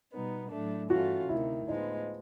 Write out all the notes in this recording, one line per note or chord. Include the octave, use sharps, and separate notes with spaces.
B2 G3 B3 D#4
A2 F#3 A3 D4
G2 E3 A3 C#4 F4 F#4
D2 C3 D#3 E4
A2 F3 G#3 B3 D#4